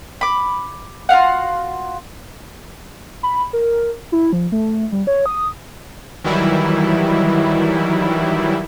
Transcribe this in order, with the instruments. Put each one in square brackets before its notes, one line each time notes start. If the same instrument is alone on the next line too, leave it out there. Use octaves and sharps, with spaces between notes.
[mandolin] B5 D6
F4 F#4 F5 F#5
[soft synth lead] B5
A#4
E4
F3
A3
G3
C#5
D#6
[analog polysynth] D#3 E3 F#3 G3 E4